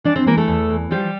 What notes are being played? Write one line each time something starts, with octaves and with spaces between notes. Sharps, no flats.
E3 D4 D5
C4 C5
E3 A#3 A#4
A3 A4
E2
E3
F3 G3 G4